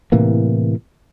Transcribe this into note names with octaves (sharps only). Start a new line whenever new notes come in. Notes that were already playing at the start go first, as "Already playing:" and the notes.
A2 C3 E3 A#3